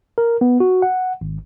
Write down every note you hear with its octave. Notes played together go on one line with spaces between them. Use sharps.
A#4
B3
F#4
F#5
G#1